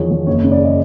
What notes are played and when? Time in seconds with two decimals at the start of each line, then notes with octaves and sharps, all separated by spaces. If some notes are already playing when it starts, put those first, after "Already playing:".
Already playing: E2 D#3 F3 C#5
0.11 E2
0.27 F#1 C#5
0.44 C#3
0.52 D5
0.65 D#5